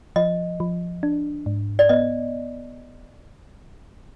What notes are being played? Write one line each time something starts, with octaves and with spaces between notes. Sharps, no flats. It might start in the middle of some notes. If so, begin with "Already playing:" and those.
F3 D#5
F3
D4
G#2
D5
B3 D#5